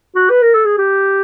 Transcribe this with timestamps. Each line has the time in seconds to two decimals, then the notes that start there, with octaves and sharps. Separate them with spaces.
0.16 F#4
0.30 B4
0.42 A#4
0.55 A4
0.66 G#4
0.78 G4